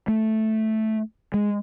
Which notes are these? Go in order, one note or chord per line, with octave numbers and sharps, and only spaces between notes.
A3
G#3